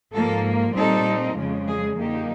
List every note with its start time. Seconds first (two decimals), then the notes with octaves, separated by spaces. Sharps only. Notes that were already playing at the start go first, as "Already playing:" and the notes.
0.14 G#2 F3 A#3 A4
0.75 A#2 G3 C4 D#4 A4
1.38 F2 C#3 F3 G#3
1.68 G#4
1.99 F#2 D3 F3 A#3 D#4 G4